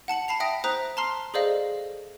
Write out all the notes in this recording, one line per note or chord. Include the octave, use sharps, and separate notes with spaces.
F#5 A5 C#7 F#7
A5 B5 C7 F7
E5 G5 D#6 A#6
C5 A#5 D#6 F#6 B6 F7
A5 A#5 C6 F6 C7
G#4 A4 C5 D5 D#5 F5